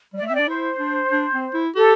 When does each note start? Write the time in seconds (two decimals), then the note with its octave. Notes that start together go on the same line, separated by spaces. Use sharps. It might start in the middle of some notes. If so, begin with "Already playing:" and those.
0.14 G3 D5
0.22 A3 E5
0.30 C4
0.34 D4 D5
0.48 E4 C5
0.79 D4
1.12 D4
1.33 C4
1.54 E4
1.75 G4 A4